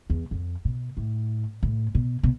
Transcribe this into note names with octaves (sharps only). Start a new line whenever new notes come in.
E2
F2
B2
A2
A2
B2
B2